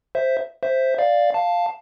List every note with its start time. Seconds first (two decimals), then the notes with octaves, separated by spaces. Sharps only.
0.15 C5 E5
0.63 C5 E5
0.98 D5 F5
1.34 F5 A5